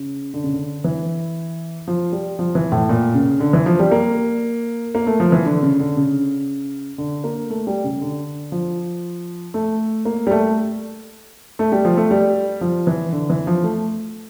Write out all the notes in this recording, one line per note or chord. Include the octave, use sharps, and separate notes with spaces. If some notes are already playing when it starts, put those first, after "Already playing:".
Already playing: C#3
D3
C#3
D3
E3
F3
G3
F3
E3
A2
A#2
C#3
D3
E3
F3
G3
A#3
A#3
A3
F3
E3
D3
C#3
D3
C#3
D3
A#3
A3
G3
C#3
D3
F3
A3
A#3
G3
A3
A3
G3
F3
A3
G3
F3
E3
D3
E3
F3
A3